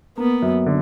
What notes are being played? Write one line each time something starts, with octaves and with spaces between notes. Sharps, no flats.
A#3 B3
F#2
D3